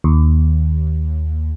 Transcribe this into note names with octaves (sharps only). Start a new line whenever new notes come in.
D#2